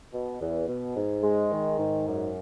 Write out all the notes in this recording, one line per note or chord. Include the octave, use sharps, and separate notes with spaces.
B2
E2
B2
G#2
G#3
D#3
G#2
F#2